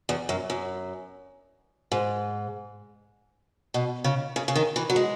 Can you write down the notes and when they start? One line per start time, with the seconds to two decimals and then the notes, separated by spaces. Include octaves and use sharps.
0.09 E2
0.29 F#2
0.50 F#2
1.92 G#2
3.74 B2
4.04 C#3
4.36 C#3
4.48 C#3
4.56 D#3
4.76 E3
4.90 F#3
4.96 G#3